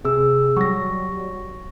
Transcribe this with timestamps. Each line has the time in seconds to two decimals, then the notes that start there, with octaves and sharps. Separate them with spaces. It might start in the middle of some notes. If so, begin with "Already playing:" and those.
0.05 C3 G#4 E6
0.57 F#3 G3 C#6 A#6